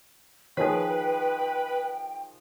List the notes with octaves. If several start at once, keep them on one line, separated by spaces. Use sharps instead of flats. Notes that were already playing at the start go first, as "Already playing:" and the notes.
D#3 F3 G#4 B4 C#5 G5